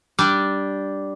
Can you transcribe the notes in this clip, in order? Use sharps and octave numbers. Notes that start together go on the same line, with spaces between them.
G3 D4